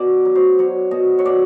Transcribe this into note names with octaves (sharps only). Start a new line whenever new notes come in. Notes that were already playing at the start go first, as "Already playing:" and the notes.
Already playing: B2 D5
F#3
C5
F#3 C#5
B2 D#5
C#5
B2 D5